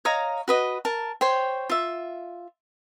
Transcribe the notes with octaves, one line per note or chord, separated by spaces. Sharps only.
C#5 D#5 F5 A#5
F#4 B4 D#5
A#4 A5
C5 C#5 G5
F4 E5